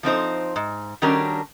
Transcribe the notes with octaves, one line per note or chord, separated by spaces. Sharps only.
F3 C4 D#4 C5
G#2
D#3 G3 C#4 D4 F#4 A#4